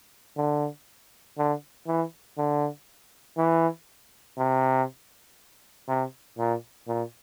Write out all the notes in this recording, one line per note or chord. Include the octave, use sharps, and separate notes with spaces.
D3
D3
E3
D3
E3
C3
C3
A#2
A#2